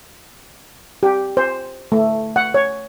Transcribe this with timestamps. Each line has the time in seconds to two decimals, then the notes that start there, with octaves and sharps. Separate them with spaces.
1.03 G4
1.37 C5
1.92 A3
2.36 F#5
2.54 C#5